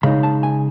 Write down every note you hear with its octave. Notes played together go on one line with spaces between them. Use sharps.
C#3 G#3 D#4 B5
A5
G#5